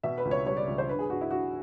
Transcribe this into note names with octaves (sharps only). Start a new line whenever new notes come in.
B2 E5
B4
C#2
C#5
G3 C#5
D5
C#2
C5
G2 B4
G#4
G2 F#4
E4
G2 F#4